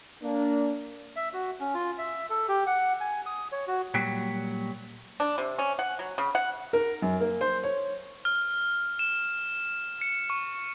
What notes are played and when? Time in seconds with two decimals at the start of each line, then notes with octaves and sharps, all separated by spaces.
0.23 A#3 D4
1.16 E5
1.34 F#4
1.60 C#4
1.75 F4
1.98 E5
2.30 A4
2.49 G4
2.67 F#5
3.01 G#5
3.26 D#6
3.52 C#5
3.67 F#4
3.94 A#2 F#3 G3 F#4
5.20 D4
5.38 C3
5.59 C#4
5.79 F#5
5.99 F#3
6.18 C#3
6.35 F#5
6.73 A#4
7.02 F#2
7.20 A#3
7.41 C5
7.63 C#5
8.25 F6
8.99 E7
10.01 C#7
10.30 C#6